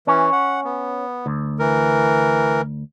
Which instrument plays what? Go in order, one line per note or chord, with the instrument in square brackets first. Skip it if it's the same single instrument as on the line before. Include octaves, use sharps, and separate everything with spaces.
[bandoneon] E3 [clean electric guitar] C#4
[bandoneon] F#5
B3
[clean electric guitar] D2
[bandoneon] E3 A#4